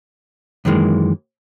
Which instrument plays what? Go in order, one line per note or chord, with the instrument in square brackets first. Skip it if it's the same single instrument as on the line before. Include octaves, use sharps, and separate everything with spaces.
[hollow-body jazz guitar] F#2 D#3 E3 G#3 A#3